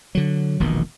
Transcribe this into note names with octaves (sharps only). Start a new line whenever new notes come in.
D3 F#3
E1 A#1 B2 D#3